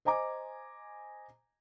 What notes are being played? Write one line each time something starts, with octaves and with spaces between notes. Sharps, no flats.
C5 D#5 G#5 A#5 D6